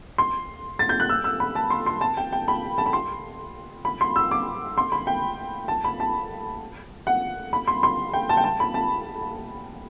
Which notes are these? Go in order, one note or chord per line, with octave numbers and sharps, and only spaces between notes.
C6
A6
G6
F#6
E6
E6
B5
A5
C6
C6
A5
G5
G5
B5
A5
B5
C6
B5
C6
E6
D6
C6
B5
G5
A5
B5
A5
F#5
B5
C6
C6
G5
A5
G5
A5
B5
A5